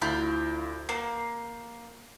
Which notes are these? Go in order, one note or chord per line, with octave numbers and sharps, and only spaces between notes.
D2 E4 F4 B5 G6
A#3 C7